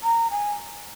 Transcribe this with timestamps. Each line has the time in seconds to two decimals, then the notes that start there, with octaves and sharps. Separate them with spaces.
0.03 A#5
0.31 G#5